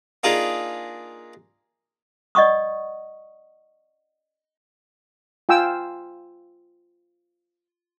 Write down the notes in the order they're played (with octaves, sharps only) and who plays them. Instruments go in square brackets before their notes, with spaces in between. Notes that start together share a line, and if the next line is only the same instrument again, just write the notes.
[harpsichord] A#3 D4 D#4 F4 G#4 A#4
[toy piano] D5 D#5 F#5 C#6 D#6
[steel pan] F4 G5 G#5 E6